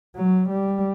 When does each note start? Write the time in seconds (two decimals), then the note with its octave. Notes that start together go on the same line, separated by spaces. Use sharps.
0.16 F#3
0.49 G3